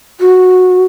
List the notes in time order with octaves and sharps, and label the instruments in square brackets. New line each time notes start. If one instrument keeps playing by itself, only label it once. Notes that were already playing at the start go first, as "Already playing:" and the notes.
[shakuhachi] F#4